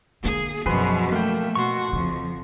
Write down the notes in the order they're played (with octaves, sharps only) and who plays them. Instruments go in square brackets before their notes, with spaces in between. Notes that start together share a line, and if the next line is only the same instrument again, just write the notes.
[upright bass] D3 A#3 [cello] G#4
[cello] F#2 B2 [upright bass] F3 [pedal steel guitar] G#4 B4 C5
[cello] A3 [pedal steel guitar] A#3 G5
[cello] B2 F#4 [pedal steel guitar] C6 C#6
[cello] F2 [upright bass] C#3